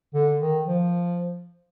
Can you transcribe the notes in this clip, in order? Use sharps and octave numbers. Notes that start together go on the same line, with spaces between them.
D3
D#3
F3